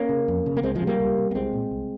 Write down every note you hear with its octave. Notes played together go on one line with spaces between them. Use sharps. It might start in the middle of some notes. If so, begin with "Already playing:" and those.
Already playing: A#3 C#4
C#3
F2
C#3
A#3
C#2 G#3 C4
F3 G#3
C3
G3 A#3
C#2
C3
A#3
C2 G#3 C4
A#2
C2